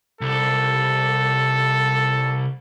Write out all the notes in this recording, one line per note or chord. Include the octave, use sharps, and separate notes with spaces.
C2 A4